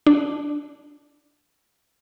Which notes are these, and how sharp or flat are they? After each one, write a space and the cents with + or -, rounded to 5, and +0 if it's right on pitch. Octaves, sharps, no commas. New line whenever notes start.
D4 +0